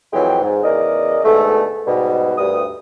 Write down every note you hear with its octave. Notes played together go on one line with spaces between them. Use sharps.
F2 E3 F#3 G#3 G5
G#2
E2 C#3 A#4 D5 D#5
G#2 B2 D3 A3
G#2 B2 G3
D2 G2 D#6